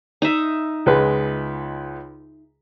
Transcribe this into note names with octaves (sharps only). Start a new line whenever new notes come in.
D#4 E5
C#2 G#3 B4